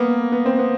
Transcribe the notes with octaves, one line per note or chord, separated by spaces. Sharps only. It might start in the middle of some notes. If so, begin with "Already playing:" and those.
Already playing: A#3 B3
B3
C4
B3